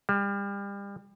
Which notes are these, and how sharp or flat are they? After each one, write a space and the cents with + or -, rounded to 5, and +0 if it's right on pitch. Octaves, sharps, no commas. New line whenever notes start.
G3 +35